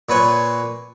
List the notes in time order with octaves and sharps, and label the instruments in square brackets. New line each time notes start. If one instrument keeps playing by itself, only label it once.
[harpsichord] A#2 B4 C#5 G#5